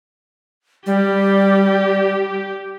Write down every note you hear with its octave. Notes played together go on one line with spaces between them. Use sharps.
G3 G4